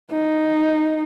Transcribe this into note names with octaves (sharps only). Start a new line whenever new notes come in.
D#4